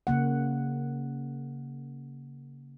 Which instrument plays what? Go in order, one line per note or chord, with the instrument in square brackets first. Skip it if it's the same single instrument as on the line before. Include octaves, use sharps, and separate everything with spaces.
[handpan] C#3 A#3 F#5